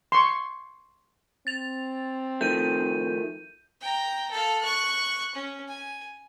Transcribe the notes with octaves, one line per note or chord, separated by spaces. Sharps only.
C6 C#6
C4 A6 F7
D#3 F3 A3 G6 D#7
G5 A#5
A4 F5
C#6 F#6
C#4
G#5